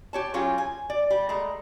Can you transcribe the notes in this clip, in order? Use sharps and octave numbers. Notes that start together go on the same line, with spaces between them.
G4 C#5 A5
F#3 C#4 F4 G4 G#4
G#5
D5
G3
G#3 A3 A#5